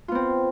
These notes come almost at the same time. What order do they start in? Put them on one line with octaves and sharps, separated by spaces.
F4 B3 C4